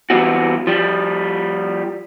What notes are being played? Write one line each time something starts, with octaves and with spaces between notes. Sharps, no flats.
E3 G3 B3 C4 F#4
F3 G3